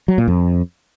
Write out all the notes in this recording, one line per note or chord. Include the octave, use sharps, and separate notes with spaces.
F#3
A#2
F2